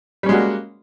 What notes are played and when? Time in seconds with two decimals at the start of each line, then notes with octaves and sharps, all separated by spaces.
0.23 G3
0.26 C#4
0.29 G#3
0.32 F#4
0.35 A#3